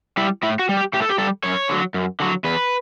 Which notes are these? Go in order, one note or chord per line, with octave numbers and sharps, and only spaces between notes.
G3 E4
A2 E4
F#4
G3
G4
A2 G4
A4
G4
G3 A4
F#2 C#5
D3 F#3
F#2
D3 F#3
E2 B4